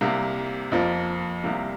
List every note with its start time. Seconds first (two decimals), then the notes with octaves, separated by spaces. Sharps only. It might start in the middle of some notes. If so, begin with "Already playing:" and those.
0.01 C2 C3 A#3
0.72 F2 F3 A#3
1.44 C2 C3 A#3